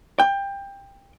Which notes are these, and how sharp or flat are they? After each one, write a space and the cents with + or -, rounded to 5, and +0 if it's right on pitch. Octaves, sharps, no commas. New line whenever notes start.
G5 +20